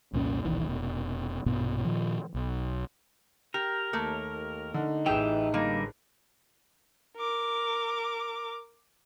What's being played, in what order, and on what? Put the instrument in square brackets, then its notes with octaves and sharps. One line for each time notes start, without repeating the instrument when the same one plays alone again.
[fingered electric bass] C2 F2 A#2 C#4
D#1 B1 D#3 E3
F1 B2
A#1 G2 B2 B3
A#2 D#3 F3
B1
[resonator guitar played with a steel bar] G4 [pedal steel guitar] A#4
[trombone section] D#2 [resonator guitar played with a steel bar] A3 A#3
[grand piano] D3 [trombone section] D#4
[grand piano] A1 G#4 [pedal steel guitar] E3 G4 E5 [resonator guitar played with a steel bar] G5
[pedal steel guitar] D3 G3 A#4 [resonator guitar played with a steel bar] A#3
[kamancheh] A#4 D6